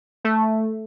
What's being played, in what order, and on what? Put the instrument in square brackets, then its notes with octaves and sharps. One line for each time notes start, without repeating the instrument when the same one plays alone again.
[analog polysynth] A3